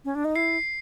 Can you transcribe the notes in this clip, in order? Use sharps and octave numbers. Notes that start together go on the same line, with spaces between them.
C#4
D4
D#4
E4 C7